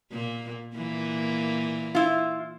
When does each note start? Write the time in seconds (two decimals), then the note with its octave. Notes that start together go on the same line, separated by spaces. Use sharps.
0.12 A#2 A#3
0.74 A#2 E3 A#3
1.95 E4 F4